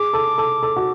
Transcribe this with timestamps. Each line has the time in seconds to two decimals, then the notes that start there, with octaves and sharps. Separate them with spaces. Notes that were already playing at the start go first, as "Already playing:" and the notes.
Already playing: G#4 D6
0.13 A4
0.38 A4
0.63 A4
0.76 F#4